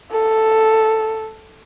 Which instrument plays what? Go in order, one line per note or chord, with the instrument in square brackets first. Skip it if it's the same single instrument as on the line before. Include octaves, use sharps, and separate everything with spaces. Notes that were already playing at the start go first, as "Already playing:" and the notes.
[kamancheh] A4